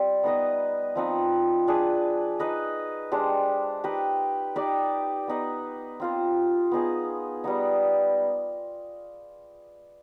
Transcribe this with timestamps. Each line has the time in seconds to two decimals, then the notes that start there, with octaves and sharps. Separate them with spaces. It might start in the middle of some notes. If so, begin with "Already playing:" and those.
Already playing: G3 C4
0.23 B3 D#4 B4 D#5
0.95 F3 C4 D#4 B4
1.67 D4 G#4 B4
2.39 D#4 B4 D#5
3.12 G#3 D4 G4 C5
3.84 D#4 G4 B4
4.56 D#4 G4 B4 D5
5.28 B3 D#4 B4
6.00 C4 F4 C5
6.72 B3 D#4 G#4
7.44 G3 B3 D#4